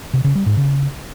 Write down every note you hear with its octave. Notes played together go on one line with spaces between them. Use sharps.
C3
C#3
G3
G#2
C#3